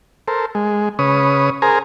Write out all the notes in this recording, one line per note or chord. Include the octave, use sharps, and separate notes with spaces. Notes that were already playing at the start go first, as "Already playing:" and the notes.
A4 A#4 C5
G#3
C#3 B4 C#5 D#6
G#4 A#4 C5 G#5 A#5